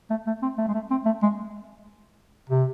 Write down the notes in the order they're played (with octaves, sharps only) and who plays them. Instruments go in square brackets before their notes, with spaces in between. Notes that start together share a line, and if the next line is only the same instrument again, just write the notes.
[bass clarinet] A3
A3
C4
A3
G#3
A3
C4
A3
G#3
C3